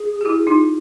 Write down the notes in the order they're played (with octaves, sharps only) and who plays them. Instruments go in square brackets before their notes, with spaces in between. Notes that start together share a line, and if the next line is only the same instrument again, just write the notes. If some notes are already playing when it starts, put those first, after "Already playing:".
Already playing: [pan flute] G#4
[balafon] G4
E4 F#4
D#4 F4